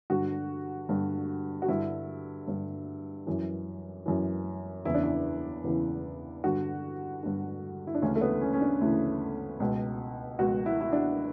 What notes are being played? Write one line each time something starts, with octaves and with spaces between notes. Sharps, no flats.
G2 D3 F#4
G2 D3
F#4
G2 D3 E4
G2 D3
F#2 E3
F#2 E3
E2 C#3 E3 E4
D4
E4
E2 C#3 E3
G2 D3 F#4
G2 D3
E4
D4
D2 C#3 E3 C#4
A3
B3
C#4
C#4
D4
D2 C#3 E3 E4
C#2 B2
C#2 B2 F#4
E4
E4
D4